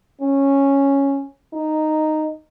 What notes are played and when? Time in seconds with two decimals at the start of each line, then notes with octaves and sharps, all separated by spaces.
0.21 C#4
1.53 D#4